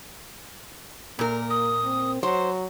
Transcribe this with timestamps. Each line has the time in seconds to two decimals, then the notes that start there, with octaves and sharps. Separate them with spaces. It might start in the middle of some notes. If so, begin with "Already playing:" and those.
1.19 A#2 A#3 A#4
1.50 D#6
1.85 C4
2.23 F#3 C5 C6